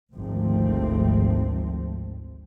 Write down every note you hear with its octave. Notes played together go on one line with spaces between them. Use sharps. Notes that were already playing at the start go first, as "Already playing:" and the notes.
G#1 D2 F3 A3 C4